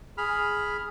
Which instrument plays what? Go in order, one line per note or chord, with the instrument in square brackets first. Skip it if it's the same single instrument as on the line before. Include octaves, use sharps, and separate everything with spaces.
[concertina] G#4 B5 F6